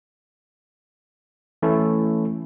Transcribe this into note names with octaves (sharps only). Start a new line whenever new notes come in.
E3 A3 C#4 E4 A4